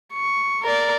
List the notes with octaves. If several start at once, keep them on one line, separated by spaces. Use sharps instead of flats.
C#6
A#4 D5